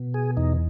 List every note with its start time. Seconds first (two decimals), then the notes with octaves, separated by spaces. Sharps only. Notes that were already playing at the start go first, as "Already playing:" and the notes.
Already playing: B2
0.14 G#4
0.37 E2 D#4